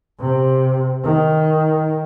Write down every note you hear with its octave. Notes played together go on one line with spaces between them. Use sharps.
C3
D#3